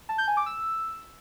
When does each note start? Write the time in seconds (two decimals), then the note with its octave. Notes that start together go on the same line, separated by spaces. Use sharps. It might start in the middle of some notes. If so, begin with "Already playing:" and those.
0.09 A5
0.18 G6
0.28 G#5
0.37 D6
0.46 E6